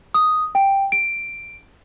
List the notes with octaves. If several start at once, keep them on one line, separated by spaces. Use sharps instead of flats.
D#6
G5
D7